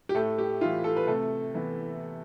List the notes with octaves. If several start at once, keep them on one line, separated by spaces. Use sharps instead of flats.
G4
A2 A3 A4
G4
E3 A3 E4 F4
A4
B4
C3 A3 A4
E3 B3 E4